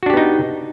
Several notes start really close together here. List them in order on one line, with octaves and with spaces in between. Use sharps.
F#4 D4 G4 B3 D#4